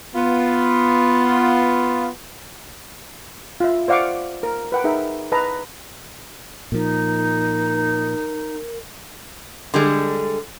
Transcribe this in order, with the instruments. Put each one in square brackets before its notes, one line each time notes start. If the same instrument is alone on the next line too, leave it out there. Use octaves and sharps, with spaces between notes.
[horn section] B3 F4
[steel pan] F4 E5
C5 D5 F5 F#5 C#6 D6
A#4
B4 F#5 G5
D#4 G#4 A#4 E5
B4 D#5 A5 A#5
[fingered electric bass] A#2 F3 [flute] D#4 [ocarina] A#4
[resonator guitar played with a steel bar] D3 G3 G#3